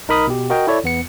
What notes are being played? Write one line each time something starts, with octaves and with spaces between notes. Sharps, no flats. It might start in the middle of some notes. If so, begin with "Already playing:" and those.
B1 D#4 A#4 B5 D#6 F6
B2 G4
F#4 A#4 D#5 G5
E4 A4 C#5 D5
E2 B3 C#7